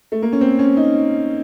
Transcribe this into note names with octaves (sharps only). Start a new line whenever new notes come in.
A3
A#3
C#4
C4
C#4
D#4